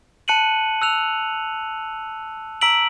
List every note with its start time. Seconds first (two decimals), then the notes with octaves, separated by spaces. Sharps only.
0.28 A5 F#6 C#7 D#7 F#7
0.82 E6 F#6 F7
2.61 A#5 E6 B6 D7 F#7